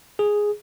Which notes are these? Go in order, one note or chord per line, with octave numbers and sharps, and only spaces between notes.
G#4